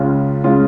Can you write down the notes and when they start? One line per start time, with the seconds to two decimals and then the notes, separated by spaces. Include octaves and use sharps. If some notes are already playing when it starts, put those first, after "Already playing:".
Already playing: C#2 C#3 G#3 C#4 F4
0.44 C#3 G#3 C#4 F4